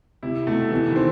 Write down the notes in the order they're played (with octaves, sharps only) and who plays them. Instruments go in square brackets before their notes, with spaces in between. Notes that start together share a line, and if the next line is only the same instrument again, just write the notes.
[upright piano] C3 [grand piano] E4
[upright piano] B2 [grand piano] A3
[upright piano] C3 [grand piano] E3
[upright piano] D#3
[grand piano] C4